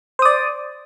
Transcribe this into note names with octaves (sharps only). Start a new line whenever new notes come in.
C5 D5 D#6